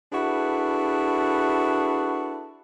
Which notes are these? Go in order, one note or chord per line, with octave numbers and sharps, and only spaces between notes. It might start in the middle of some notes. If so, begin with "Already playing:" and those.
D4 E4 F#4 G#4 A4 B4